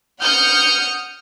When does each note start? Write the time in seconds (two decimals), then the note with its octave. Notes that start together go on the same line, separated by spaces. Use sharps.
0.22 F#5 D#6 F6 G6 C#7